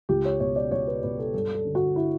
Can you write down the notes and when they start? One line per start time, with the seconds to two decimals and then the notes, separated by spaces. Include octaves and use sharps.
0.09 C#2 G4
0.25 C#5
0.40 B2 C#5
0.56 D5
0.71 C#2 C#5
0.87 B4
1.03 B2 B4
1.19 A4
1.34 G2 A4
1.55 A4
1.65 D3
1.75 F#4
1.96 E4